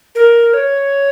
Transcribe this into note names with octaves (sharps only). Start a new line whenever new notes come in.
A#4
C#5